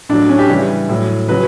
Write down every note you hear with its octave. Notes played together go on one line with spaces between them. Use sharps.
A2 F#3 D4
C#4
G4
C#3 E3 G3
A2 F#3
C#3 F#3 B4